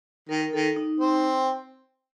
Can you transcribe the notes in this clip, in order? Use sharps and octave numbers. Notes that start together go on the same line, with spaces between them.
D#3 A#4
A#4
D#3 A4
D#4
C4